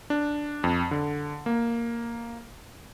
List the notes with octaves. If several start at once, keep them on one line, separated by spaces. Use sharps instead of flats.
D4
F2
D3
A#3